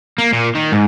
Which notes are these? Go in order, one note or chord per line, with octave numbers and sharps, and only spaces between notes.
A#3
A#2
D#3
G#2